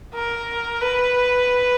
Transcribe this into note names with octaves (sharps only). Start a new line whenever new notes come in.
A#4
B4